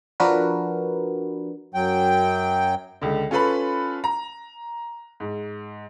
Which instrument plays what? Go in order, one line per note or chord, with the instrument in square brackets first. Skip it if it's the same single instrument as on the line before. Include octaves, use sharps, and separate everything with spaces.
[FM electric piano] F3 D4 F#4 A#4 B4
[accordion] F#2 F#3 G5
[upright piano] C#2 D3
C#4 F4 A4 B4 B5
A#5
G#2